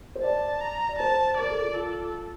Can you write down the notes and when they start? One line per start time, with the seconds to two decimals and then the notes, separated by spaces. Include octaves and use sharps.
0.15 C5
0.23 D5 A5
0.61 A#5
0.89 D5
0.99 C5 A5
1.38 A#4 D5
1.50 A4
1.63 F4
1.75 F4 A4